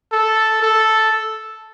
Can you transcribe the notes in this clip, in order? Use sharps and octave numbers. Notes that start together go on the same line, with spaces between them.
A4
A4